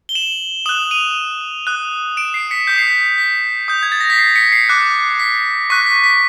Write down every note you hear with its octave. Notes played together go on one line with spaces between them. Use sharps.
G7
E7 F#7
D#6 F#6 E7 F#7
D#7 F7
D#6 F#6
D7 E7
C7
B6 C#7
D#6 G6 B6
C7
B6
B6
D#6 G6
G#6
A6
A#6
B6
C7
B6 C#7
C7
D6 F#6
B6
C#6 F#6 B6
B6
B6